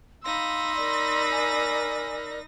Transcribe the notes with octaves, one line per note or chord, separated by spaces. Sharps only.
D#4 F5 B5 C6 E6 A#6
A#4 D5
G#5